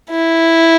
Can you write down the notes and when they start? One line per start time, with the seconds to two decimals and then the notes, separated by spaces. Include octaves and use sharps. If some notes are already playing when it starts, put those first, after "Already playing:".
0.10 E4